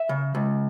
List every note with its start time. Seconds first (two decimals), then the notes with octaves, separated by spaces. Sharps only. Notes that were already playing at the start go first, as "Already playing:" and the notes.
Already playing: E5
0.09 C#3
0.35 C#2